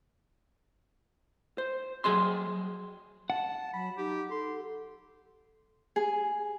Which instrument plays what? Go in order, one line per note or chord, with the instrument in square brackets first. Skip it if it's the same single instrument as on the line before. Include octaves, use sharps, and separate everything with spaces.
[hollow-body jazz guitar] C5
F#3 G#4 D#5 C6
[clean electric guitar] F#5 [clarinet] A5
[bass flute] F#3 [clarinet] B5
[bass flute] D#4 [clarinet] G4
[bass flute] A4 [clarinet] C6
[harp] G#4